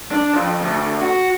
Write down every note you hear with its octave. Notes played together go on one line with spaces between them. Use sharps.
D4
F2
D2
F#4